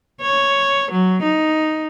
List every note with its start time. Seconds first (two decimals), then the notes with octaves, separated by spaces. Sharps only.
0.21 C#5
0.91 F#3
1.23 D#4